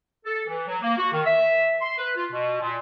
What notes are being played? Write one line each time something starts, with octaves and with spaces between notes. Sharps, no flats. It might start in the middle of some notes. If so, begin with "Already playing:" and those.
A4
E3
F#3
A#3
F#4
D#3
E5
C6
B4
F4
B2
A#2